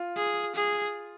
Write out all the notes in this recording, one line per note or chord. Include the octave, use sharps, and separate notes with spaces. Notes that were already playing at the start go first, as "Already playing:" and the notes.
Already playing: F4
G#4
G#4